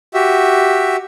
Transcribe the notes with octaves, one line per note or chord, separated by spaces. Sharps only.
F#4 G4 E5